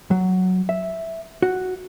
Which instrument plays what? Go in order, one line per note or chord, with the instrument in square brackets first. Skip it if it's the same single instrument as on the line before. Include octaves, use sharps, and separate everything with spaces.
[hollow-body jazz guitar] F#3
E5
F#4